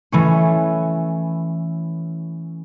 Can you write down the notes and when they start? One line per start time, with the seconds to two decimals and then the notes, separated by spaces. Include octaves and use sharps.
0.12 E3 A3 C#4